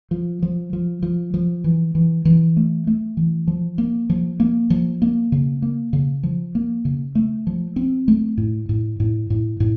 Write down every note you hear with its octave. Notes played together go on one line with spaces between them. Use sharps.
F3
F3
F3
F3
F3
E3
E3
E3
A3
A3
E3
F3
A#3
F3
A#3
F3
A#3
C#3
A#3
C#3
F3
A#3
C#3
A3
F3
C4
A3
A2
A2
A2
A2
A2